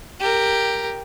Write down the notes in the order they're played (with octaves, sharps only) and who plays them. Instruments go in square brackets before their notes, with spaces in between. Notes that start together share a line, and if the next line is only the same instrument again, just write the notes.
[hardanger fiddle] G4 A#4